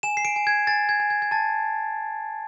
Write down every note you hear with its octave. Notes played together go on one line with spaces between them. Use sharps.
G#5 E7
C7
D7
G#5
G#6
G#5 A6
G#6
G#5
G#6
G#6
A5 A6